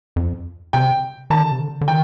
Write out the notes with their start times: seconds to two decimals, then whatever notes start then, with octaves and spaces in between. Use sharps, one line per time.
0.16 F2
0.73 C3 G5
1.30 D#3 A5
1.41 D3
1.51 C3
1.60 D3
1.81 D3
1.88 D#3 G5